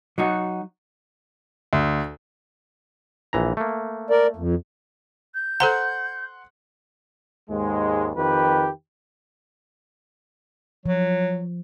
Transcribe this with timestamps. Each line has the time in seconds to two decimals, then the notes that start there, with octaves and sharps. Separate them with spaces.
0.18 F#3 D#4 F#4
1.73 D2
3.33 A#1 E3 A#5
3.57 A3 A#3
4.10 A#4 D5
4.36 F2
5.34 G6
5.60 A4 C5 F#5 A#5 C6 F#6
7.49 D#2 G#2 G#3
8.16 F2 D#3 G4 B4
10.86 F3 F#3